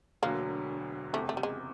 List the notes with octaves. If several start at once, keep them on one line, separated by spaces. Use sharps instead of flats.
E1 D2 D3 F#3 A#3
F#1 E2 C3 A3
A3
G3
G#3